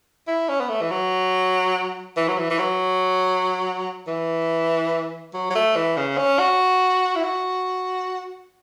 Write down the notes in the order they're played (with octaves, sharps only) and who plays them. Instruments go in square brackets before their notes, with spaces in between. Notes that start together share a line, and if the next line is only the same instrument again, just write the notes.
[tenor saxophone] E4
C#4
B3
A3
E3
F#3
E3
F#3
E3
E3
F#3
E3
F#3
F#3
A3
E3
C#3
C#4
F#4
E4
F#4